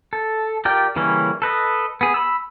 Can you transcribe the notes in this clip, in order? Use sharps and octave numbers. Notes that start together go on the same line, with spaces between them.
A4
F4 G4 A#4 D5 G5
C#3 E3 G3 A#3 C#4
A4 B4 D#5
B3 G#4
B5 E6